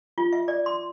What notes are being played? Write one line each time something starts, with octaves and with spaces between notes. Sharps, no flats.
F4
E5
D5
C6